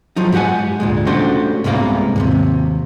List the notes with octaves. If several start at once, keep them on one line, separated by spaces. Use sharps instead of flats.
F3 F#3 D#4
G#2 G4 A#4 F#5 G#5
D2 A#2 G#3
A3 C#4 D4 F#4 G4 C5
C2 G#2 A#3 B3 F5 A#5
D#2 A2 C3